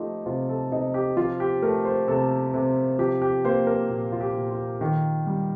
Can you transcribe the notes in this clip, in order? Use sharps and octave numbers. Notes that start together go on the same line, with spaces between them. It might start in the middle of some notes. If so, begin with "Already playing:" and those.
Already playing: F3 A3 D#4 F4 G4
C3 F4
A4
C3 D#4
G4
F3 F4
G4
A3 A#4
C5
C3 A4
C3
F3 G4
G4
A#3 C5
A#4
A#2
F4
G4
A#2
F4
D#3
G3